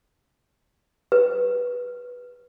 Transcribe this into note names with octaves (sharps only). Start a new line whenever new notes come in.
B4